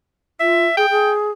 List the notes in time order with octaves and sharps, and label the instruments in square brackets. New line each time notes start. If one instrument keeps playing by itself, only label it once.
[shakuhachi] F4 [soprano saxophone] E5
[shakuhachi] G#4 [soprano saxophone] G5
[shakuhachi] G#4